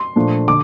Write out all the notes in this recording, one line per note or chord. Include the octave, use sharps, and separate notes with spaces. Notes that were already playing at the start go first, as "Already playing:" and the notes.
Already playing: C6
A#2 F3 A3 D4
D3 D6